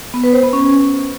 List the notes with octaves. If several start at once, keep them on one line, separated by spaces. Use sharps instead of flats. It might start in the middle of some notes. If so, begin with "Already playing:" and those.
B3
B4
C5
B3
C#4